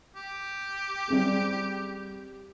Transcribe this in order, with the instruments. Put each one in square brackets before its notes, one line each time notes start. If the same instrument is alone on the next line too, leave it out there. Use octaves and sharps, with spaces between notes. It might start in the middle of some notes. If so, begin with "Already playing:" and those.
[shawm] G4
[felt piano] G3 C4 G#4